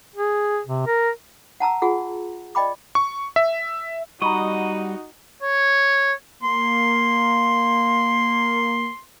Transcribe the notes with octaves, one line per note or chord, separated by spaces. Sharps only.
G#4
C3
A#4
F#5 A5 A#5 E6
F4 G#4 F#5
D5 D#5 G5 B5 D6
C#6
E5
G3 D#4 F#4 D#5 F#5 A#5 B5 C#6
C#5
A#3 C6